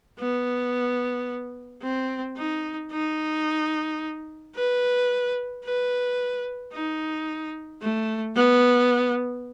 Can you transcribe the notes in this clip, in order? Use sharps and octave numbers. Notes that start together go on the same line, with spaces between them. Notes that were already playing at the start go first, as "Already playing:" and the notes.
B3
C4
D#4
D#4
B4
B4
D#4
A3
B3